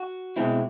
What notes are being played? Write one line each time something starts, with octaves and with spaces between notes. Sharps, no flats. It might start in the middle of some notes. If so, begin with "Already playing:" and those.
Already playing: F#4
B2 G#3 C4 E4